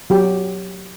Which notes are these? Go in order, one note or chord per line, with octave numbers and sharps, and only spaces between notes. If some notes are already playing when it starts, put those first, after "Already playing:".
F#3 G4